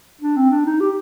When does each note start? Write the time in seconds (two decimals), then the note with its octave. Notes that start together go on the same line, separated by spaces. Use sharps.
0.21 D4
0.37 C4
0.51 D4
0.66 D#4
0.80 G4